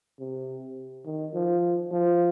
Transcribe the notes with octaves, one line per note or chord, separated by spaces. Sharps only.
C3
D#3
F3
F3